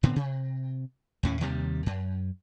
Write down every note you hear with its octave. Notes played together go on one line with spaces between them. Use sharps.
A2 D3 B3 C4
C3
D#2 A2 C#4
D#2 C3 D#3 G3
F#2